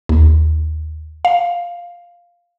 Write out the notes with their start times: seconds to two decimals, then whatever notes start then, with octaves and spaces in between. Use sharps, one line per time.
0.09 D#2
1.25 F5